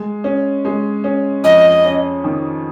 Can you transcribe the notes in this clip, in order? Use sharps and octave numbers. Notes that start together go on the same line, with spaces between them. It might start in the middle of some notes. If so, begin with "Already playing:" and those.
Already playing: G#3
C#4
G#3
C#4
F2 D#5
C#4
D#3